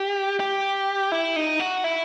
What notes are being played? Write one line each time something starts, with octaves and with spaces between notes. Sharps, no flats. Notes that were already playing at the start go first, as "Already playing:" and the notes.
Already playing: G4
G4
E4
D#4
F#4
E4